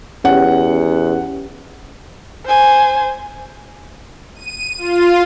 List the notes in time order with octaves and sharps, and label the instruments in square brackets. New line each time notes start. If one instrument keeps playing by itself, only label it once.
[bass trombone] E2 [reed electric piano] C#4 G4 [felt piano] F#5
[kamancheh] C5 G#5
[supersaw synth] D#7
F4